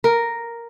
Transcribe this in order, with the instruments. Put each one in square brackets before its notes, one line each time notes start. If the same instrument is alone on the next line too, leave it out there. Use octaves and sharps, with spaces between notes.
[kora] A#4